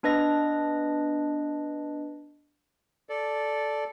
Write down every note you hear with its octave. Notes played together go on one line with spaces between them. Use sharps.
B3 D4 B4 D#5 A#6
A4 D5